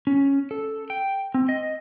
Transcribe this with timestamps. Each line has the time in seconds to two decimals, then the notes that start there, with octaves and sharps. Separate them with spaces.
0.07 C#4
0.51 A4
0.90 G5
1.34 C4
1.49 D#5